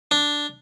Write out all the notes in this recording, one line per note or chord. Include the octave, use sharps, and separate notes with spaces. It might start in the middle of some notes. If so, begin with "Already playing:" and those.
D4